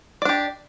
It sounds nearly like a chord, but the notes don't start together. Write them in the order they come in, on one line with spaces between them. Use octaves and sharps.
D5 D4 G4